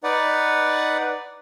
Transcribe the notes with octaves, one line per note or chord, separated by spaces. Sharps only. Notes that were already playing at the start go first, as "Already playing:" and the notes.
D#4 B4 D5 F#5